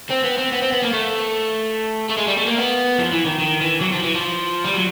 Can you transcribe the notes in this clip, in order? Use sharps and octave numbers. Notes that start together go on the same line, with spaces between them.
C4
B3
C4
B3
C4
B3
A#3
A3
A3
G#3
G3
A3
A#3
B3
F3
E3
D#3
D#3
E3
F#3
F3
E3
F3
G3
F#3